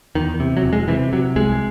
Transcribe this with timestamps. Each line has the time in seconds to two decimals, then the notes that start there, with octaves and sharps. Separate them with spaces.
0.15 E2 D#3
0.40 C3
0.57 F#3
0.63 E1
0.73 G#3
0.88 C3 E3
1.13 C3 F#3
1.36 C2 G#3